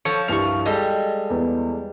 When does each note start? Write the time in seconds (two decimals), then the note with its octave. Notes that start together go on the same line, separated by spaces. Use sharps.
0.05 F3 A4 C#5 C#7
0.28 C2 G2 F5 C#6 F7
0.66 G3 G#3 A4 D5 D#5
1.30 E2